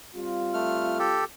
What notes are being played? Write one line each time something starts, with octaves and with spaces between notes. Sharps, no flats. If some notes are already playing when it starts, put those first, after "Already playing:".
G3 C4 F4
A3 F6
G4 A4